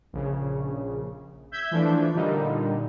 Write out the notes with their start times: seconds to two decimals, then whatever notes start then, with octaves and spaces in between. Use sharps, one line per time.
0.13 A#1 C#3
1.51 E5 G6 G#6 B6
1.71 E3 F3 A3 D4
2.14 A#2 D3 G3 A#3 D#4